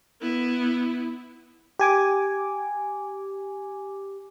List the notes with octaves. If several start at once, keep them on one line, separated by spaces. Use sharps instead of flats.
B3 E4
G4 G#5 D6